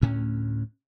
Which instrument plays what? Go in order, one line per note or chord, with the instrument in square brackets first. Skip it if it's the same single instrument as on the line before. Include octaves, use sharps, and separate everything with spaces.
[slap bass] D2 A2 C#4